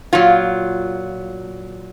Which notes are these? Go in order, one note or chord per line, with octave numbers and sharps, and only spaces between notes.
A#2 F#3 F4